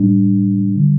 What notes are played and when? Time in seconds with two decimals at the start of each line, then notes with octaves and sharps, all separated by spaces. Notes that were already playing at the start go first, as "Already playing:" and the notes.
Already playing: A2 G3 D4
0.76 D3 G3